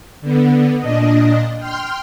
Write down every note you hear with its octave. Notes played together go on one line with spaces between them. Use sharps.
D3 B3
A#2 D4 D#5
G5 C6 F6